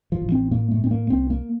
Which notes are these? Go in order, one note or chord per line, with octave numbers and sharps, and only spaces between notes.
F3
A1
C4
A2 A#3
A3
A2 C4
A#3
C2 C4
A#3